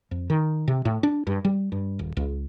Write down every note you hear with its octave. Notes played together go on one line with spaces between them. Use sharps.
F2
D#3
C3
A2
D4
G2
G3
G2
D#1
C#2